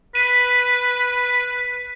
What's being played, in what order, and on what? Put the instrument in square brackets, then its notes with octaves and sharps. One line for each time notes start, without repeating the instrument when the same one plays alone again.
[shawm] B4 [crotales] B6 D#7